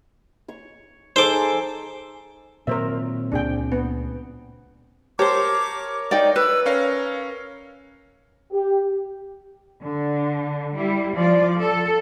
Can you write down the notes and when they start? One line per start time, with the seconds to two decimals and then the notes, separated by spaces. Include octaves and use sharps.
0.48 C#5 C#6
1.16 D#4 G#4 A4 C5 D6
2.67 A#2 D#3 F#3 C4 A#4 C5 E5
3.32 C#2 A#2 D4 G#4 G5
3.72 B3
5.19 G4 A#4 C5 C#5 A5 D6
6.11 D#4 D5 G5
6.36 B4 E6
6.66 C#4 A#4 C#5 F5
8.53 G4
9.83 D3
10.76 G3 E4
11.15 F3 F4 D5
11.58 A4